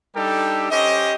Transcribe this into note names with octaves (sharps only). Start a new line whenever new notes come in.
G3 D4 D#4 G4 A4
C#4 G4 C5 D#5